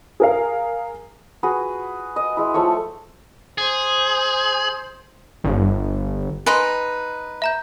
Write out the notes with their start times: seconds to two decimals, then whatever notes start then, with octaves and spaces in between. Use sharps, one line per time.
0.20 G#4 A#4 F5
1.43 F#4 G#4 B4
2.16 D#5
2.37 G#3 E4
2.54 F3 A3 C#5 C#6
3.58 G#4 C5
5.44 G1
6.46 D#4 B4 G#5 C6
7.42 E5 A#5 G6